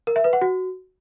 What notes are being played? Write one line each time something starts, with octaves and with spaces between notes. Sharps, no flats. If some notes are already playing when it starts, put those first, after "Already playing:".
A#4
E5
B4
F#5
F#4